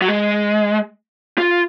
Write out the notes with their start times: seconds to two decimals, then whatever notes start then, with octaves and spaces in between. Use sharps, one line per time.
0.02 F#3
0.08 G#3
1.38 F4